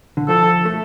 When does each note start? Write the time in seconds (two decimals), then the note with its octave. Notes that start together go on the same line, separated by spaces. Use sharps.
0.17 D3
0.28 F3 A4
0.65 A3